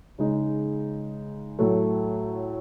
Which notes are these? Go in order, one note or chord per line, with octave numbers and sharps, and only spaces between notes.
C#3 G#3 D#4
A2 F#3 A3